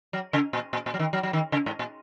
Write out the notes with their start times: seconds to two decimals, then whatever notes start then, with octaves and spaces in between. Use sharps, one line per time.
0.13 F#3
0.33 C#3
0.53 A#2
0.73 A#2
0.86 A#2
0.94 F#3
0.99 D#3
1.13 F#3
1.23 F#3
1.33 D#3
1.52 C#3
1.66 G#2
1.79 A#2